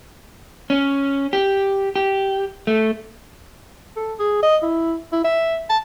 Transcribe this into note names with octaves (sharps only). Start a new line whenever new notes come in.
C#4
G4
G4
A3
A4
G#4
D#5
E4
E4
E5
A5